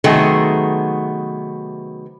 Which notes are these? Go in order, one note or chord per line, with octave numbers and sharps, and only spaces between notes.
C3 D#3 F#3 A3 B3 G#4